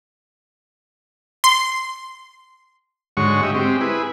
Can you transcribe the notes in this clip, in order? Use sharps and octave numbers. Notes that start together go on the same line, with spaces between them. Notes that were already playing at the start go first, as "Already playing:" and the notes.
C6
G#2 D3 G#3 F#4 C#5 C#6
G4 D#5 E5
G#3 C4 G4
E4 G#4 B4